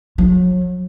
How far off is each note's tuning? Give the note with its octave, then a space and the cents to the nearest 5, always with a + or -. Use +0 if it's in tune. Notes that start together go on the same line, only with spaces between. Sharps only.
F#3 -35